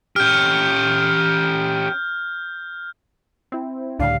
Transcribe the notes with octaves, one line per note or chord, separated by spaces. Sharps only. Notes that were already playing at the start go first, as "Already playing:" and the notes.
C#4 G4 F6 G6
C4 E4
C#2 A2 D3 G3 D4 F5